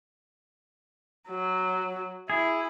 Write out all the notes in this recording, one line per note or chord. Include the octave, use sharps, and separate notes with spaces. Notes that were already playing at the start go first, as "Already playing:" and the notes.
F#3
E4 G#4